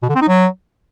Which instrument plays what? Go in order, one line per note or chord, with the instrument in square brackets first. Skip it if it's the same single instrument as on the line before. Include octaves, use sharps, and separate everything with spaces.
[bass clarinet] B2
D3
C4
D#4
F#3